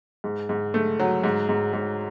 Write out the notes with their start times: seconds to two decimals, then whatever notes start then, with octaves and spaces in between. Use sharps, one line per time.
0.24 G#2
0.49 G#2
0.74 A3
0.99 F#3
1.24 G#2
1.49 G#2
1.73 G#2